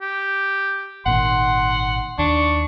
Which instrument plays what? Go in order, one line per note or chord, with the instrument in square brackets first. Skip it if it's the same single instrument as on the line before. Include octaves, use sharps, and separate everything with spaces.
[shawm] G4
[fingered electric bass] G#1 A#2 D#3 [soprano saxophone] F#5 [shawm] C6
[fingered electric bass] D#2 [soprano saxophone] D4 [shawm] C#6